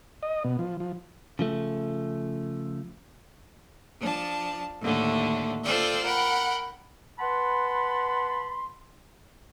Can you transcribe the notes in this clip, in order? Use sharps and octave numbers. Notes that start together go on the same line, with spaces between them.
D#5
B2
F3
F3
C#3 F3 A3
F3 D4 A5
D#2 A2 D3 A3
F4 A4 C5 D5 E5 G5
A#4 F#5 G5 B5
B4 F#5 A5 B5 C6